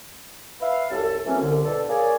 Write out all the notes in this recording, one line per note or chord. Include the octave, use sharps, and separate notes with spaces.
B4 E5 F5
C2 F#2 A4 A5
E3 F#3 A3 A#3 C4 C#4
C2 D3
B2 D4 A4
A#3 G#4 C#5 D5